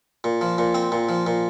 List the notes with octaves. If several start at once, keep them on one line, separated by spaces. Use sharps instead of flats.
A#2
F3
A#2
C4
A#2
F3
A#2